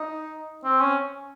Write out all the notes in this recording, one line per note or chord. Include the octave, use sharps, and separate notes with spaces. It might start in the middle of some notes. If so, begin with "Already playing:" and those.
Already playing: D#4
C4
C#4